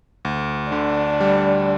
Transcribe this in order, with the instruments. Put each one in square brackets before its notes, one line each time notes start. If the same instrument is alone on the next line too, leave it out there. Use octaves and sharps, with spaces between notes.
[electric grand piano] D2
[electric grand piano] D3 [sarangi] D4
[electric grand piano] G3